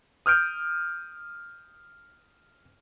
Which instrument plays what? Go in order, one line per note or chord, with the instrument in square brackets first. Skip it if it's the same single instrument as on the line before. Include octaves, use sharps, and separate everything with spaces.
[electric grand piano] D#6 F6 G6 D7